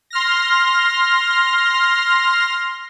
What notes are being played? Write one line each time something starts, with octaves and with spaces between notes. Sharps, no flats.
C6 F6 A#6